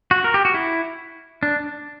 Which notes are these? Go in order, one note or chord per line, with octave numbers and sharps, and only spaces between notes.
F#4
A#4
G4
F#4
E4
D4